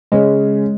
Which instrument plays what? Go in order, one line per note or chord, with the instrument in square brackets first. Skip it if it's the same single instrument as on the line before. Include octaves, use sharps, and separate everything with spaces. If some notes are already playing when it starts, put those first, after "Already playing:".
[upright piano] C#3 C#4 [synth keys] G#3